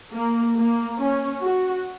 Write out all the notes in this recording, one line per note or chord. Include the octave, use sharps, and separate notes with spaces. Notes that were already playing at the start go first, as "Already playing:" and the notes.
A#3
A#3
C#4
F#4